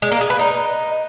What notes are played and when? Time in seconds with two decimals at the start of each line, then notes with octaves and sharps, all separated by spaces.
0.02 G#3
0.12 A#3
0.21 G#4
0.30 B4
0.39 D#4